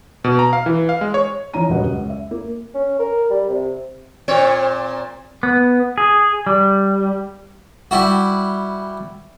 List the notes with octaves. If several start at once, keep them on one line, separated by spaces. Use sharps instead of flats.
B2
A#5
F5
E3
F5
G#3
C#5
E3 F3 C#4 D#4 A#5 D#7
D#1 C#2 F#2 B4 D#5 F#5
C#2
E5
A#3
C#4
A#4
G3
C3
A#2 C4 C#5
B3
G#4
G3
G3 E4 F#4